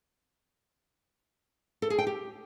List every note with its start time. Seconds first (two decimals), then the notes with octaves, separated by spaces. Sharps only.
1.82 A4
1.90 G#4
1.98 G5
2.07 G4